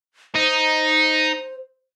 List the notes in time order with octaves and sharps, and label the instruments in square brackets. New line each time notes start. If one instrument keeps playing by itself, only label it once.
[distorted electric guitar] D#4 [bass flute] C5